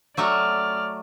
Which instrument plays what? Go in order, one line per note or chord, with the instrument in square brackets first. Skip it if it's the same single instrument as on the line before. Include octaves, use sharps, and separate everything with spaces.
[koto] F#3 A3 F#4 [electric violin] D5 F6